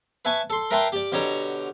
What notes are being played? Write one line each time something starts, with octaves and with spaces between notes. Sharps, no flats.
B4 E5 G#5 A5 C#6
A4 C6
A#4 B4 E5 G5 A5 C6
G4 D5
B2 D3 G4 C#5 A#5